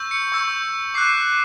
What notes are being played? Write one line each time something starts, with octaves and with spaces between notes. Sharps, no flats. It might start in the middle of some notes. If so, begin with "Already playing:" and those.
Already playing: C#6 E6 G6
C#7
C#6 E6 G6
D6 F#6 C7